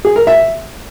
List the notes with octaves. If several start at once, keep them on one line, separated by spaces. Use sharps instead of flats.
G#4
A#4
E5